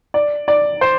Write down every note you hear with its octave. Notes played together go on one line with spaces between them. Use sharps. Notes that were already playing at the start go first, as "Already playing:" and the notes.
D5
D5
C5